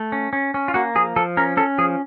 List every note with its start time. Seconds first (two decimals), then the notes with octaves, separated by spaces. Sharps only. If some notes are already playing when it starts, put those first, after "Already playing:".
Already playing: A3
0.12 C#4
0.33 C#4
0.54 C#4
0.68 F4
0.74 A#3 F#4
0.95 F3 G#4
1.16 F3 A4
1.37 C#4 A#4
1.57 C#4 A4
1.78 F3 G#4